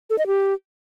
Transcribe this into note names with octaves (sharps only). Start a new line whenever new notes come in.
A4
D#5
G4